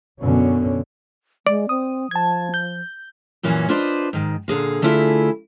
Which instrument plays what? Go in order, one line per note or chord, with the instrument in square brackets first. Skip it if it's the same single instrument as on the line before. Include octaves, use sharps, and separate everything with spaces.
[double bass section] F#2 B2 D3 C#4
[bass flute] G#3 [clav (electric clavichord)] D5
[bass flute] C4 [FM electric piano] D#6
[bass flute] F3 [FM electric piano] A5 G#6
[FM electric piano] G6
[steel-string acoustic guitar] F#2 A#2 E3 A#3 C#4 F#4
D4 F4 B4 C5 D5 D#5
G#2 D#3
A#2 D3 G#4 F5
D3 A3 E4 F4 G4 G#4